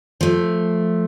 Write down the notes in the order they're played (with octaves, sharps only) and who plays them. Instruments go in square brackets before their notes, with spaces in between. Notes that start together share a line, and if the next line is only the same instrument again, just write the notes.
[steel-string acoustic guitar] F3 A3